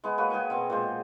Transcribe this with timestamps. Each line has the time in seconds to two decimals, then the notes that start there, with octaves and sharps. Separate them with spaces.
0.04 G#3 B3 G#4
0.18 A#3 F#4 B4 C#5
0.30 F#4 G#4 G5 G#5
0.50 B2 C4
0.70 A#2 G#3 C5